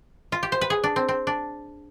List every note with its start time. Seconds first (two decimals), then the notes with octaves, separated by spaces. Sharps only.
0.32 F4
0.43 G4
0.52 C5
0.61 B4
0.70 G#4
0.84 D4
0.96 C4
1.08 C4
1.27 D4